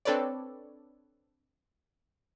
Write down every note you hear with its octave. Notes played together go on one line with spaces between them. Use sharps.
C4 D4 A4 B4 C#5 D5